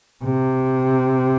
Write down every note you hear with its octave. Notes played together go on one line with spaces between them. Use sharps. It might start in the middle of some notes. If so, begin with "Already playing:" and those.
C3